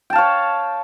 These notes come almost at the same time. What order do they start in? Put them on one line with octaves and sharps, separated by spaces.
G5 A5 F5 C#5